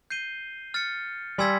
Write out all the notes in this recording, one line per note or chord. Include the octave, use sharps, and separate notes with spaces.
G6 C7 D#7 G7
F6 A6 C#7
G3 G#5 C6 E6 G#6 B6